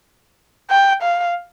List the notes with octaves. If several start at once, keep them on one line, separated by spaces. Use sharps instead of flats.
G5
F5